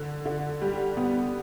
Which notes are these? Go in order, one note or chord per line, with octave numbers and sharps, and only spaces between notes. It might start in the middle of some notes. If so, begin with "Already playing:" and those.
Already playing: D3
D3
G3
B3